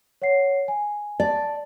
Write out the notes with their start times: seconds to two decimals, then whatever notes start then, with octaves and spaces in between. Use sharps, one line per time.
0.22 C#5 F#5 C7
0.68 G#5
1.20 D5 A5